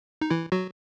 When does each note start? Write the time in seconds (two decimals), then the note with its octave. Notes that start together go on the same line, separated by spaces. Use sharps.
0.21 D#4
0.30 E3 E4
0.52 F#3 F#4